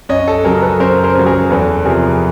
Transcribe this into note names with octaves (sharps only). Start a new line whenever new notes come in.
F#2 C#5 D#5
A4
C#3 F#3 G#4 A#4
A4 B4
F#2 A#4 C5
A#4 C5
C#3 F#3
G#4 A#4
E2 A4 B4
C3 F3 G#4 A#4